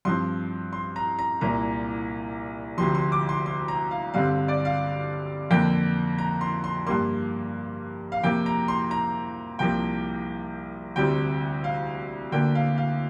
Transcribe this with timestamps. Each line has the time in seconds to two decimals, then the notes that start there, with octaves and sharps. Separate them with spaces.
0.05 G2 F3 C4 C6
0.73 C6
0.96 A#5
1.19 A#5
1.41 C2 A#2 A#3 A#5
2.78 D2 C3 F3 C6
2.95 C6
3.12 D6
3.29 C6
3.46 C6
3.68 A#5
3.91 F5
4.14 G2 D3 G3 C4 F5
4.31 F5
4.48 D5
4.65 F5
5.50 F2 D3 A#3 G5
6.19 A#5
6.41 C6
6.64 C6
6.87 G2 G3 A#3 C6
8.12 F5
8.23 F2 C3 A#3 G5
8.46 A#5
8.68 C6
8.91 A#5
9.59 C2 C3 F3 A#3 G5
10.96 D2 C3 G3 C4 G5
11.64 F5
12.32 D2 D3 A#3 G5
12.55 F5
12.78 F5